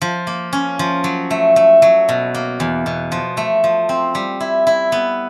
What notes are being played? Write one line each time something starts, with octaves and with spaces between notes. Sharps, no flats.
F3
A#3
C#4
F3
F#3
A3
A3
F#3
B2
A#3
E2
B2
F3
A3
F3
C4
G3
E4
E4
B3